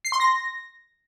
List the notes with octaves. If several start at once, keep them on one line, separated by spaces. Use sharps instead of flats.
C7
C6
A#6